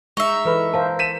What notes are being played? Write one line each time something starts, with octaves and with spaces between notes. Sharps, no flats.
G#3 D#4 E5 C#6
E3 A4 B4 B5
A#4 C5 F5 A5
B6 D#7 E7